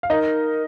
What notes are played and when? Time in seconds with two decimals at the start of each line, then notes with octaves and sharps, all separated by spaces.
0.03 F5
0.10 D#4 A#4 D#5